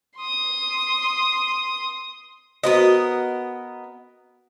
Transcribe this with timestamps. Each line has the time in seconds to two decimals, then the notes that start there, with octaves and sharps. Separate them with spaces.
0.18 C6 D#6
2.63 B3 F#4 A#4 C5 D#5 F5